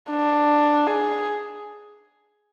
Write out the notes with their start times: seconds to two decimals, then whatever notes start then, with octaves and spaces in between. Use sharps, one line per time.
0.11 D4
0.87 G#4